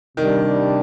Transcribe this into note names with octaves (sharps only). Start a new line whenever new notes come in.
C3 D#3 G3 D4